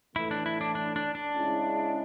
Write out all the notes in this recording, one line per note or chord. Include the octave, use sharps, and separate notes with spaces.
A2 E3 A3 E4
D4
E4
D4
D4
D4
D4
C#3 G#3 C#4 E4